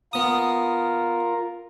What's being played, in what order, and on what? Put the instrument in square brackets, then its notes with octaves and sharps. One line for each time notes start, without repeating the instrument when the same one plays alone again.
[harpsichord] B3 D#6 [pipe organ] F4 A#4